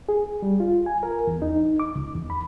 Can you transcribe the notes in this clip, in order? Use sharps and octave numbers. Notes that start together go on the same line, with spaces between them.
G#4
G3
F4
G#5
A#4
E2
D#4
D6
C#2
E2
B5